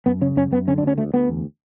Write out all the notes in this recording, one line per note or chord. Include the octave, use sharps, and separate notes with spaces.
F#2 B3
C#3 C#4
F#2 C#4
F#2 B3
D3 C#4
D4
D2 C#4
D2 A3
D2 B3
E2